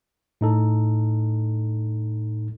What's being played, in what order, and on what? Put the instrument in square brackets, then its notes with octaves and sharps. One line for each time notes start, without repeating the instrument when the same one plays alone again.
[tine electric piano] A2 D#4 A4